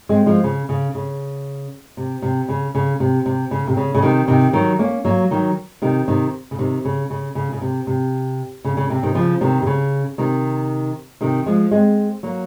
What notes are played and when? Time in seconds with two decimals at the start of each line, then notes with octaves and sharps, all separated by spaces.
0.09 G#3 C4
0.26 F3 G#3
0.44 C#3
0.69 C#3
0.95 C#3
1.97 C3
2.22 C3
2.49 C#3
2.75 C#3
3.00 C3
3.26 C3
3.51 C#3
3.67 C3
3.77 C#3
3.95 C#3
4.02 C3 D#3
4.28 C3 D#3
4.53 D#3 F#3
4.79 A#3 C#4
5.05 F#3 A#3
5.31 D#3 F#3
5.82 C3 D#3
6.08 C3 D#3
6.51 C#3
6.59 C3 D#3
6.85 C#3
7.10 C#3
7.35 C#3
7.52 C#3
7.61 C3
7.87 C3
8.65 C#3
8.77 C#3
8.90 C3
9.03 C3 D#3
9.15 C#3 F3
9.41 C3 D#3
9.62 C3
9.67 C#3
10.18 C3 D#3
11.21 C3 D#3
11.46 F3 G#3
11.71 G#3 C4
12.23 F#3 A#3